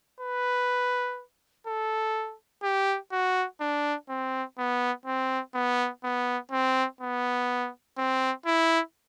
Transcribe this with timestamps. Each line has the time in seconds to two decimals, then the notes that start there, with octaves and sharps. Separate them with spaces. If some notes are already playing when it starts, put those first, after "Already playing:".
0.20 B4
1.67 A4
2.63 G4
3.12 F#4
3.61 D4
4.09 C4
4.58 B3
5.06 C4
5.54 B3
6.04 B3
6.51 C4
7.01 B3
7.98 C4
8.46 E4